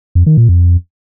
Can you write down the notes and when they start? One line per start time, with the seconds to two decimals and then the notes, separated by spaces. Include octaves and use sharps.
0.15 F2
0.26 D#3
0.37 A#2
0.49 F2